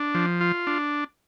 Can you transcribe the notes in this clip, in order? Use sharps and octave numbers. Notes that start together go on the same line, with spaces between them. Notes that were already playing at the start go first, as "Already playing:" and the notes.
Already playing: D4
F3
F4
D4